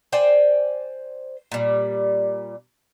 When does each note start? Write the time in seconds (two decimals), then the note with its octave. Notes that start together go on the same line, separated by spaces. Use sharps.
0.13 C5 D5 G5 G#5
1.52 A#2 G3